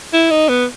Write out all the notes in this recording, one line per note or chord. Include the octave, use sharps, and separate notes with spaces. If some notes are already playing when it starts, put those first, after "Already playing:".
E4
D#4
B3